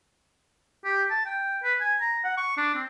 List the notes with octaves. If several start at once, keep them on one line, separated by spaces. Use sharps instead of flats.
G4
A5
G5
B4
G#5
A#5
F#5
C#6
D4
C4